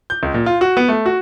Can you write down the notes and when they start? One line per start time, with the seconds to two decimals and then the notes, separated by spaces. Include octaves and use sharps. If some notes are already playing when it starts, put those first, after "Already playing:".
0.10 G6
0.23 C#2
0.34 A#2
0.46 F4
0.61 F#4
0.77 B3
0.88 A3
1.06 F#4